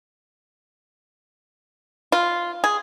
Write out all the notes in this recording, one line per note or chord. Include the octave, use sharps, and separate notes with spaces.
F4
G#4